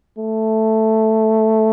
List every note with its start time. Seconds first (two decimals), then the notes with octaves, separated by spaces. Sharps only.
0.18 A3